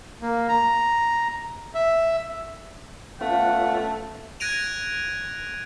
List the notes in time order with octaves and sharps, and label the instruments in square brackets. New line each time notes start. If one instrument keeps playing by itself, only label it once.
[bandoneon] A#3
A#5
E5
[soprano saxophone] A3 [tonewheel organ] B3 C#4 F4 [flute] F5 [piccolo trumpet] F#5
[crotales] F#6 G#6 A#6 D7 D#7 F7